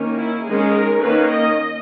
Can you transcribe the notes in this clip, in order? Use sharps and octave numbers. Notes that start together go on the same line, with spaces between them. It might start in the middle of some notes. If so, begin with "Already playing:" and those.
Already playing: D#3 A#3 C#4
E4
D#3 G#3 C#4 G#4
A#4
D#3 A#3 C#4 B4
D#5